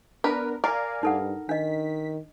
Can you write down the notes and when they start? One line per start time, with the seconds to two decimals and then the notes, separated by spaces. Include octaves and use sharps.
0.24 B3 D4 A#4 B4
0.64 A#4 D5 F5 G#5
1.03 G2 D#4 A4 F#5
1.49 D#3 D4 D#5 B6